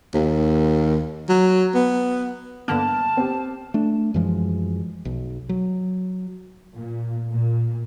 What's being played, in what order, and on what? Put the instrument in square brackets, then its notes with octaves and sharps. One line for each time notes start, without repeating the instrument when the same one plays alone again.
[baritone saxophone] D#2
F#3
B3
[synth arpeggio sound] G2 D3 A#3 [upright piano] B3 F6 [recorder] A5
[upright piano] C4 G4
[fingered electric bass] A3 D4
F#2 E3 F3 G#3
B1
F#3
[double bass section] A#2
A#2